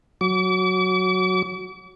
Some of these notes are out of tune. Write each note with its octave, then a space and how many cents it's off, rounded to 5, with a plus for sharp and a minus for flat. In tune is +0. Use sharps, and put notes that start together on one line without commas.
F#3 +0 D6 -40